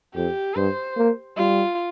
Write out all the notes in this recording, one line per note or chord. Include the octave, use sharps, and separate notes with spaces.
F2 G4
G2 C5
A#3
G3 F4